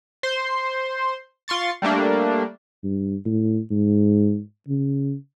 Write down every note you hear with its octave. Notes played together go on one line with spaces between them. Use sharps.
C5 C6
F4 C6 C#6 A6
G3 A3 A#3 D4
G2
A2
G#2
C#3